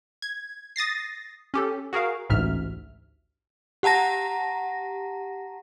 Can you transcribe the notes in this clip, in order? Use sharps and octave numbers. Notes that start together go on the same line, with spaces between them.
G#6
D#6 A6 A#6 C7
C#4 G4 A4
F#4 G#4 A#4 F5
A1 D2 G#2 E5 F6
G4 F#5 A5 A#5 A#6